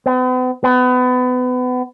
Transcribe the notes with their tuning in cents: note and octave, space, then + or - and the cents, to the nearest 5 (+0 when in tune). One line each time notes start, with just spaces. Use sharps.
B3 +45
B3 +30